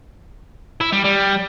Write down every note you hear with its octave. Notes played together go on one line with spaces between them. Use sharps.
E4
G3
G3